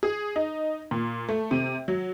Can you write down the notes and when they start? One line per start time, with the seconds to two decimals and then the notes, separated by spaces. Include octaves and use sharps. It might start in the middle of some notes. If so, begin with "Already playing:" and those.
0.03 G#4
0.36 D#4
0.91 A#2
1.29 A3
1.51 C3
1.88 F#3